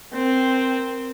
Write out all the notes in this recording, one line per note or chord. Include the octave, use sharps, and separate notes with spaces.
C4 A#4